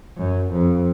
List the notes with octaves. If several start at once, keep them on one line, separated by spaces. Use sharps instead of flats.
F#2
F2